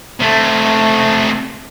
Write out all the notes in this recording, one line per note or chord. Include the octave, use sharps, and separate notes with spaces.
C3 A3